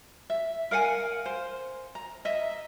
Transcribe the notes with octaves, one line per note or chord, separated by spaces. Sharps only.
E5
A#4 F5 F#5 G#5
C5
A#5
D#5 E5